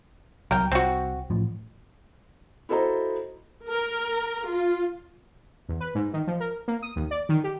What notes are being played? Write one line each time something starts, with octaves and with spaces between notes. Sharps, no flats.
C2 F#3 A#4 G5
C2 C4 F#4
A1 A2 F3
E4 F#4 A4 C5 D#5 A#5
A#4
F4
E2
B4
G#2
D#3
F3
A#4
A#3
D#6
D#2
D5
D#3
G4